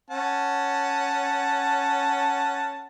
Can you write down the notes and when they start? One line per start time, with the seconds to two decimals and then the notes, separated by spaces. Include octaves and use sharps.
0.10 C#4 F#5 A5